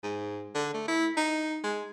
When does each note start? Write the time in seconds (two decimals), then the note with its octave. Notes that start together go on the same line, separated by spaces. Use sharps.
0.03 G#2
0.55 D3
0.74 A3
0.88 E4
1.17 D#4
1.64 G#3